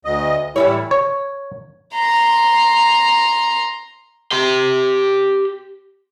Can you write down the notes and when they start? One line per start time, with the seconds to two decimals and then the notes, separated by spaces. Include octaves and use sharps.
0.05 D2 D#5
0.56 A2 E3 G3 E4 C#5
0.91 C#5
1.95 A#5 C6
4.32 G4 C6